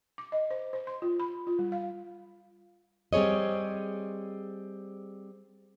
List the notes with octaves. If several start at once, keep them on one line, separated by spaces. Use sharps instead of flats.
D6
D#5
C5
C5
C6
F4
B5
F4
G3
F5
G3 C4 G#4 C#5 D#5